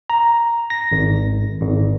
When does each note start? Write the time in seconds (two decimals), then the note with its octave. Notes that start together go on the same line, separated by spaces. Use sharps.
0.10 A#5
0.70 A#6
0.92 G#1
1.61 G#1